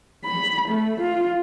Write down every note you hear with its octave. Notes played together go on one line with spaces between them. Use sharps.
B5
A3
F4